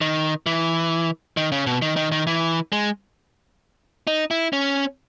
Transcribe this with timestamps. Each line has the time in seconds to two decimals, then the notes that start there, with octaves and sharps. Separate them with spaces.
0.01 D#3
0.46 E3
1.37 D#3
1.52 C#3
1.67 B2
1.82 D#3
1.96 D#3
2.12 D#3
2.27 E3
2.72 G#3
4.07 D#4
4.31 E4
4.53 C#4